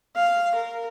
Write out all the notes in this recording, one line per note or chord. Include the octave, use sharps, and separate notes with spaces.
F5
A#4